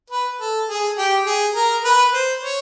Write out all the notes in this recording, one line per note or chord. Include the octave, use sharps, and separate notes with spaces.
B4
A4
G#4
G4
G#4
A#4
B4
C5
C#5